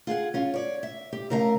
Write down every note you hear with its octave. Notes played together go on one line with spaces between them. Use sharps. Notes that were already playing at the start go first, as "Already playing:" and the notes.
F4 G#4 F5 F#5
C#4 F4
C#5 D5
E5
G4
C#3 A3 A#4 F5 F#5 A#5